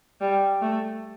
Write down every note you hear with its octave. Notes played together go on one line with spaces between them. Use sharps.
G3
A3